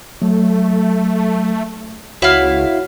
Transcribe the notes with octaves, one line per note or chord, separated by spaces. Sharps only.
F#3 A3
C#2 E4 F#4 C#5 F5 F#5